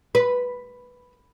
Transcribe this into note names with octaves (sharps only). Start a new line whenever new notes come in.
B4